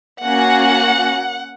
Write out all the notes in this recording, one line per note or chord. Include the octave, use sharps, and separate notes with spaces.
A#3 C#4 F#4 F#5